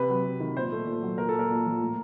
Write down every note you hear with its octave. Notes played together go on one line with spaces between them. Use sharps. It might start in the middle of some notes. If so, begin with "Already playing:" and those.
Already playing: C3 B4
F#3
C3
D#3
A#2 C5
A3
A#2
F#3
A#2 A#4
A4
A#3 A#4
A#2
F3
A2